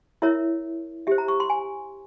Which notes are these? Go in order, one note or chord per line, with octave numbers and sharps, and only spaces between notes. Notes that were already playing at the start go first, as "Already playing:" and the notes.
E4 A#4 C#5 E5
G4 C5 E5
A#5
C#6
C6
G#5